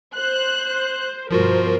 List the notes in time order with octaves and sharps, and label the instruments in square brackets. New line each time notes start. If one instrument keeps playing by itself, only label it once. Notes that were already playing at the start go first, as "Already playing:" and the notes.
[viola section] C5 [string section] F#6
[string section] G2 B2 C5 [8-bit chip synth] F3 F4 F#4 [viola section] A#4